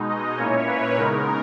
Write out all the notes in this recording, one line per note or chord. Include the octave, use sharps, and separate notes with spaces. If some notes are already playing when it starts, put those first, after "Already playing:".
Already playing: B2 G#3 D#4
D#5
A#2 A#3 C#4 E4 C#5
B4
C#3 G#3 B3 D#4 A#4